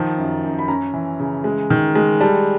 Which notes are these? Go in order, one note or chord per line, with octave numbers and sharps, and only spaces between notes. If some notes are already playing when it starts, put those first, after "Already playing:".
Already playing: D#3 F3 A5
F#2
F#2
B5
C#4 A#5
E3
C#3
G#3
D#3
G#3
G3 A5